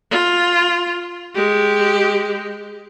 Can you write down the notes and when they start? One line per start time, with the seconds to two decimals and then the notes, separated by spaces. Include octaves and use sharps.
0.11 F4
1.35 G#3 G4